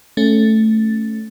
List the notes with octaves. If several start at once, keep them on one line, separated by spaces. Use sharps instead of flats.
A3 C#4 A6